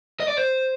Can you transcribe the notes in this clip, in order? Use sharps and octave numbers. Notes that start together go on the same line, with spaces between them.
D#5
D5
C5